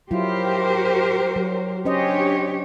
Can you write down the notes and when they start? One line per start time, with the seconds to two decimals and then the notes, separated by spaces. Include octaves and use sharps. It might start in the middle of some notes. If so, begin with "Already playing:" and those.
0.11 F#3 E4 F4 G4 A#4 C5
1.36 F#3
1.85 C#4 D4 G4 C5 C#5 D#5